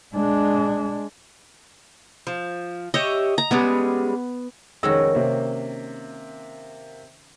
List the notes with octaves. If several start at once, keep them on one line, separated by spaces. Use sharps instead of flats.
G#3 D4
F3
G4 C#5 D#5 E5
A#5
G3 G#3 B3 C#4
F1 D#3 G#3 C#4 F#4 E6
C3 A#3 C4